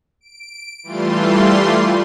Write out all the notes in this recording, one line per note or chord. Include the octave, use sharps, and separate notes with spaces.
D7
E3 G3 A3 F4 C6